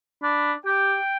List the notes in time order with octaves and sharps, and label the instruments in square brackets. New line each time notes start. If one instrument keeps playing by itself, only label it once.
[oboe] D4 [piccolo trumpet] B5
[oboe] G4 [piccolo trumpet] G5